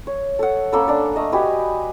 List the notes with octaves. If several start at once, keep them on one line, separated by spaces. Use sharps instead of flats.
C#5
A4 F#5
A#3 C#4 A4 B5
D4 D5
A3 D#5
F#4 G4 B4 G#5